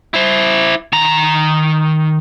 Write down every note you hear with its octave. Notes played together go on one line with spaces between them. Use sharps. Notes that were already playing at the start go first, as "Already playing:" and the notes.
E4 C5
D#3 A#5